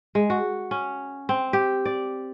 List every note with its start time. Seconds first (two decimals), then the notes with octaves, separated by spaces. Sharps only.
0.15 G#3
0.30 F#4
0.71 C#4
1.29 C4
1.53 G4
1.85 D5